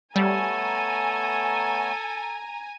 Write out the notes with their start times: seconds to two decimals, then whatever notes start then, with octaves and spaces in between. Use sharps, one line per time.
0.16 G3 A3 B3 A4 C#5 G#5 A#5